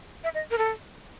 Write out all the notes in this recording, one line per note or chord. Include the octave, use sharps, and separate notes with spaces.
E5
D#5
A#4
A4